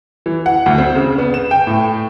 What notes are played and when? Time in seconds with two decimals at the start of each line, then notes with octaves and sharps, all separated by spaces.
0.26 E3
0.46 F#5
0.66 D2
0.78 C4
0.95 C#3
1.18 B3
1.34 E7
1.51 G5
1.67 A2